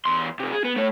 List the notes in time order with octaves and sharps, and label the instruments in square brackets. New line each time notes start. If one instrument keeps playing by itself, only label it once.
[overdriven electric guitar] E2 C6
C3 F3
G#4
B3
A3 C#5